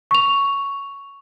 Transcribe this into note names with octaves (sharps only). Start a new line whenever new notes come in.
C#6 F7